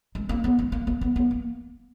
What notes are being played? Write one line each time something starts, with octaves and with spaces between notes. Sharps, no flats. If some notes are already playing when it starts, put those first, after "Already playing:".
G#3
A#3
B3
G#3
A#3
A#3
B3
B3
A#3